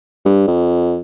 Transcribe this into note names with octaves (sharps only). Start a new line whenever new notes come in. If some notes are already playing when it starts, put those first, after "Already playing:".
G2
F2